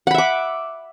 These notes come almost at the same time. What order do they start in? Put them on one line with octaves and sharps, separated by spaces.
F#5 B5 E5 D6